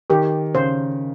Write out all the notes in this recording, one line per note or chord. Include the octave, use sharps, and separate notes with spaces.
D#3 G4
C#3 C5